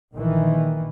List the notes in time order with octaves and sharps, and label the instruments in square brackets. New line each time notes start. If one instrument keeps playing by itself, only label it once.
[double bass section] A#1 D#3 E3